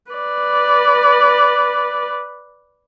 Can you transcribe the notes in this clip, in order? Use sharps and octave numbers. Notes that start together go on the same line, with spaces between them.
B4 D5